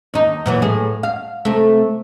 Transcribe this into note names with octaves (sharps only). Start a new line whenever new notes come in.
D#2 D#4
A#2 E3 F#3
A2 G#4
F5
C3 A3